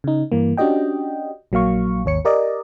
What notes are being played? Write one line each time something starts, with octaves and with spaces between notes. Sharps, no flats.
C#3 D#4
G2 E3 A#3
C#4 D4 F#4 G4 D#5 G5
A#1 F#3 A#3 F5 C#6
G#1 D#2 C#5 C#7
G4 A#4 D5 D#5